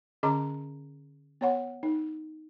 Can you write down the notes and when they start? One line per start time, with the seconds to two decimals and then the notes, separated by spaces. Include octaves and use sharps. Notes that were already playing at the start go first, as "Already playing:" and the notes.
0.23 D3 C#4 G#4 D#5 A#5 D6
1.41 B3 C#5 F#5
1.83 D#4